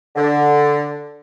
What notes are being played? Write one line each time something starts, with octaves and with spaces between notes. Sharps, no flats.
D3